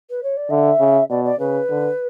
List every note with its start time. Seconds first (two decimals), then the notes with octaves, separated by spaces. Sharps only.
0.10 B4
0.23 C#5
0.37 D5
0.50 D3 E5
0.80 C#3
1.10 B2 D5
1.24 D5
1.39 C#3 B4
1.70 D3